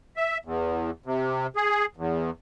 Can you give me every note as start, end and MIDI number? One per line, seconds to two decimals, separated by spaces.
0.17 0.38 76
0.45 0.90 40
1.06 1.47 48
1.56 1.85 68
1.97 2.30 40